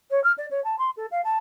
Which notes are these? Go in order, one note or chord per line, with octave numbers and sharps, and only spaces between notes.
C#5
F6
D5
C#5
A5
C6
A4
F5
A5